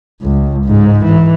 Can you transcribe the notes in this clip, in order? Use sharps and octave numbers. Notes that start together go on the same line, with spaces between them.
C#2
G#2
E3